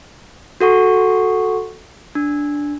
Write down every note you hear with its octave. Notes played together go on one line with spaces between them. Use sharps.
F#4 A4 F#5 C#6
D4